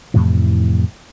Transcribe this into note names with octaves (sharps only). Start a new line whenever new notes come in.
F2 A2 C3 E3